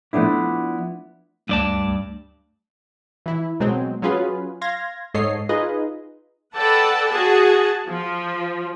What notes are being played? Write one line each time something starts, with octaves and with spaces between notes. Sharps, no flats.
F3 A3 B3 D4 E4
D2 G2 D5 A5
E3 E4
B2 F#3 G#3 C4
F#3 C#4 F4 G#4 B4
F5 C6 G#6 A#6
G#2 A4 C#5 D#5 C7
D#4 F4 G#4 B4 D#5
A4 B4 D5 F#5 G5 A5
F#4 G#4 F#5 A5
F3